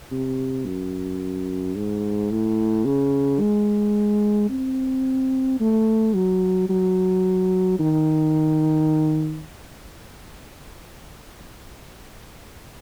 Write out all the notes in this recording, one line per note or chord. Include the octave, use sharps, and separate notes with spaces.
C3
F#2
G#2
A2
C#3
G#3
C4
A3
F#3
F#3
D#3